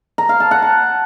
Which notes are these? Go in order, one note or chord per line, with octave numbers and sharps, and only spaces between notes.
A#5
F5
A5
F#5
A5